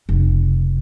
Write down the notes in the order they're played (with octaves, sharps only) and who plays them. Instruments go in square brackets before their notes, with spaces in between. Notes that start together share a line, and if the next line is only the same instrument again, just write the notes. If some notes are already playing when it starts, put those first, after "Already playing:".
[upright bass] F1 C#3